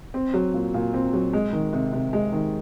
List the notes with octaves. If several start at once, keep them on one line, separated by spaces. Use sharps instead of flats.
C4
F#3
A#2
A#2
C4
F#3
G#3
D#3
C3
C3
G#3
D#3